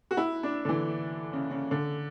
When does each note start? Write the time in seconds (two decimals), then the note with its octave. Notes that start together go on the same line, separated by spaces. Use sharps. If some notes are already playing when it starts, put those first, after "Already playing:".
0.11 F#4
0.17 E4
0.43 D4
0.65 D3
0.69 E3
1.33 C#3
1.51 C#3
1.71 D3